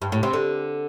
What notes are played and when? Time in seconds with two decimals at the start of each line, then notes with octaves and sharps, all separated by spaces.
0.02 G2
0.12 A2
0.23 C3
0.33 D3